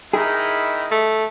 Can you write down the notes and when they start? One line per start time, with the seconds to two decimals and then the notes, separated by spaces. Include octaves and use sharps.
0.13 D#3 D#4 E4 G#4
0.91 A3